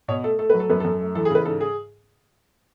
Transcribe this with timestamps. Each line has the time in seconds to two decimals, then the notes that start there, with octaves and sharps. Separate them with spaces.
0.08 B2 C#5
0.24 A3 A4
0.39 A3 A4
0.50 F#3 B4
0.60 A4
0.70 F#2 B4
0.80 F#2 A4
1.01 A3
1.15 E3 A4
1.25 G#4
1.30 C#3 B4
1.45 G#2 A4
1.61 G#4